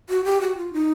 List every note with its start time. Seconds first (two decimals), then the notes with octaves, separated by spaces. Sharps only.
0.10 F#4
0.25 G4
0.41 F#4
0.57 F4
0.73 D#4